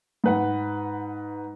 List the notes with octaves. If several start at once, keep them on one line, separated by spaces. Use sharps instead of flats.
G#2 B4 F#5